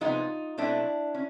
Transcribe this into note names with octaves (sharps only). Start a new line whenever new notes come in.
C3 F3 G#3 B3 D#4 F4
B2 F#3 A3 C4 D4 E4
C#4